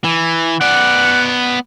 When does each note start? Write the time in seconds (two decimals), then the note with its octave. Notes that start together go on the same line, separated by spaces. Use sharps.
0.04 E3
0.61 B3 D5 F#5